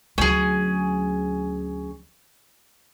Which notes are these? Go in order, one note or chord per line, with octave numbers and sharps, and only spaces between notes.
D2 F#3 C#4 G#4